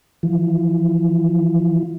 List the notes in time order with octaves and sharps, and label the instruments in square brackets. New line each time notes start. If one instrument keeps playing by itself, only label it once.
[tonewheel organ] E3 F3